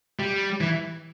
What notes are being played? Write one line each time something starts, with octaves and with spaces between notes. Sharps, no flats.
G3
E3